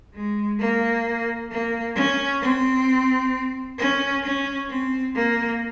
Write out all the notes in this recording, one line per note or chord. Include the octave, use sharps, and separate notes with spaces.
G#3
A#3
A#3
C#4
C4
C#4
C#4
C4
A#3